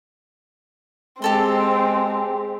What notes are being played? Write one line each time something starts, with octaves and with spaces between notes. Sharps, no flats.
G#3 C4 G4 A4 C6